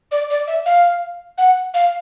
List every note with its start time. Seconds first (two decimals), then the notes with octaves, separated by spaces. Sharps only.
0.11 D5
0.30 D5
0.47 E5
0.65 F5
1.37 F#5
1.74 F5